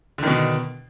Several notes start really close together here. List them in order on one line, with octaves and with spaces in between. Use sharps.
D3 D#3 B2